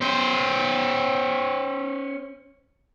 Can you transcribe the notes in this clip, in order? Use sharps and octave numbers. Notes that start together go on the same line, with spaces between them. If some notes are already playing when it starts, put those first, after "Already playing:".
C#4 C5